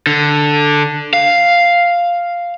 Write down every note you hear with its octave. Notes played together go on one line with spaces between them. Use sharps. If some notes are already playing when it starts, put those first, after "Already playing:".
D3
F5